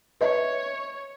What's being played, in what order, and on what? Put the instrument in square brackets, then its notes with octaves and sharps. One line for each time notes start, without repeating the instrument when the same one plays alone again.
[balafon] B4 D#5 E5 [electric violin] C#5